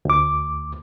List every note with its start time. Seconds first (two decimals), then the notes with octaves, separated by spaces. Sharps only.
0.05 D2 D6